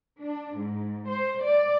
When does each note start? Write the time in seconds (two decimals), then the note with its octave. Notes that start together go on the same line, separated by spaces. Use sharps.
0.21 D4
0.57 G#2
1.08 C5
1.42 D5